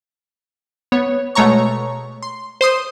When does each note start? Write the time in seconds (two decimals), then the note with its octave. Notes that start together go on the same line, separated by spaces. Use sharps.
0.92 B3 C#5
1.35 B2 G#3 A3 C#5 A#5 C#6
2.22 C6
2.61 C5 C6 D#6